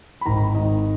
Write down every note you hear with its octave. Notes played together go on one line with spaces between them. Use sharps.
B5
G#1 G#2 D#3 A#5
G#1 G#2 D#3 D#5